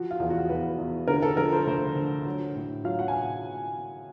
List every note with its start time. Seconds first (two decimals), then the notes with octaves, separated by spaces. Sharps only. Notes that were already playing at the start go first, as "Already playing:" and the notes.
Already playing: F3 F#4
0.11 F4
0.20 E2
0.30 F#4
0.49 E2 B4
0.78 E2
1.08 D3 A#4
1.22 A4
1.37 F3 A#4
1.52 C5
1.67 D2 C5
1.96 D3
2.25 F#3
2.56 A2
2.84 F#3 F5
2.99 F#5
3.08 G#5